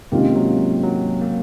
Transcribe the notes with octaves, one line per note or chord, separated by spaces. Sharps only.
C3 D#3 G#3 A#3 C#4 F4
F#3
F#3
A#3